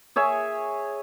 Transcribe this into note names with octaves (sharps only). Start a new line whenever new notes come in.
G#4 C#5 E5 G#5